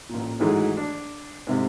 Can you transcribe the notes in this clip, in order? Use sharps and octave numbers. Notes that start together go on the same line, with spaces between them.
A1 A#2
G#2 D#3 E3 F#3 G#3 A3
D4
G#2 C3 A3